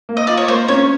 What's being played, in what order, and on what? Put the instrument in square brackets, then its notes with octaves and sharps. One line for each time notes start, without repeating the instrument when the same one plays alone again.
[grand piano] A#3
[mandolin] D#5
[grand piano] F4 [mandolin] D5
[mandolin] C#5
[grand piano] A#3 [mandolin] C5
[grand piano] C#4 [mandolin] C#5